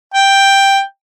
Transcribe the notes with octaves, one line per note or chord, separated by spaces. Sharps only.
G5